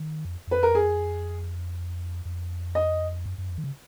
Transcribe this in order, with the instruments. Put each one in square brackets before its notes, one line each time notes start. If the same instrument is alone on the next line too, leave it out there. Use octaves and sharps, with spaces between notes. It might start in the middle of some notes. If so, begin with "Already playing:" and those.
Already playing: [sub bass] D#3
F2
[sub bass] F2 [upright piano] B4
[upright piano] A#4
G#4
[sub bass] F2
[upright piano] D#5
[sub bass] F#2
F#2
F2
D#3
C#3